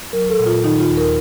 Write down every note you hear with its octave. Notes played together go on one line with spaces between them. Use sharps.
F#3 A#4
A4
A#2
F4
D#3 D#4
F4
D#2
A#4